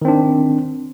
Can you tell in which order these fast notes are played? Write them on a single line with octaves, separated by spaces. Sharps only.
D#3 C4 D4